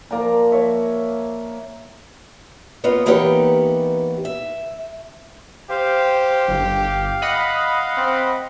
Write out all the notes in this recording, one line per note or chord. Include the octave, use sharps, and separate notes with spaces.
F3 A#3 D5 A#5
C#5 E5
A#3 B3 F4 C#5 D#5
E3 A#3 B3 D#4 G4 C#5
E5
G4 C5 F5
G1 F5
D#5 F#5 B5
C4